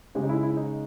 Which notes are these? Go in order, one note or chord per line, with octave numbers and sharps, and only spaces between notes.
C#3 G#3 G4
D#4
E4
E4
D#4